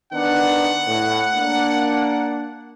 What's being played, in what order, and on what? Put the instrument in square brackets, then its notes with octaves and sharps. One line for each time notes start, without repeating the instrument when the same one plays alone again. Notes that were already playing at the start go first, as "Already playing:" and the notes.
[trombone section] D#3 B3 D4 [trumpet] F#5
[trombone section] A2
A#3 D4